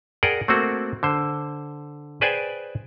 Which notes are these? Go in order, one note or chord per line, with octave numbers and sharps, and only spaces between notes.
G#4 A#4 D5 F#5 G5
A3 A#3 C4 F#4
D3 C5
G#4 B4 C5 D5 G5 G#5